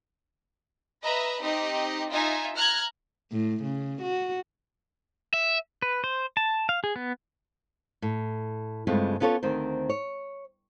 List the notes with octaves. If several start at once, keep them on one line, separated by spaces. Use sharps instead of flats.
B4 D#5 E5 A#5 B5
C4 D#4 G4 D#5
D#4 F4 E5 G#5
A#5 F6 F#6 G#6
A2
C#3
F#4
E5
B4
C5
A5
F5
G#4
B3
A2
G2 C#3 G#3 A3 C4 F4
B3 C#4 F4 A4 C5 C#5
D2 D#3 C4 C5
C#5